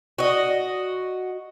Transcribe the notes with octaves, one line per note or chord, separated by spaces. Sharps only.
F#4 D#5